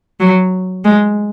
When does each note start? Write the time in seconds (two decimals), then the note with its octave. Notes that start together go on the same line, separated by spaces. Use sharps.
0.20 F#3
0.84 G#3